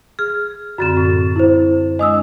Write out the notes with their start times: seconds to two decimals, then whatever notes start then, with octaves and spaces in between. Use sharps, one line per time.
0.19 G#4 F6
0.78 F#2 D3 C4 F#4 A6 E7
0.97 A2
1.36 E4 C5
1.99 G#3 D4 D#5 D#6 E6